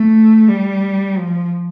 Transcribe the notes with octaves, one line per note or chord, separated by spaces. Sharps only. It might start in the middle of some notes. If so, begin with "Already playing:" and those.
Already playing: A3
G3
F3